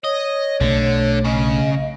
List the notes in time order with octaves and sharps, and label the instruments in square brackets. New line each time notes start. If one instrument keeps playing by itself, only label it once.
[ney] C#5 [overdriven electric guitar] D#5
[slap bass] B1 A3 [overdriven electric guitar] D3
[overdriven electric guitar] C#3 [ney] D#5